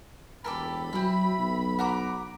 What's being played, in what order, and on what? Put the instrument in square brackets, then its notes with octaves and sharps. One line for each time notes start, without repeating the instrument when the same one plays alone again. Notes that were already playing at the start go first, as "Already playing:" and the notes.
[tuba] E1 [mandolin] G4 A4 A#4 [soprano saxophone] B5
[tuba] F#3 [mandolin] C4 E4
[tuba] B1
[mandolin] F#4 A#5 D6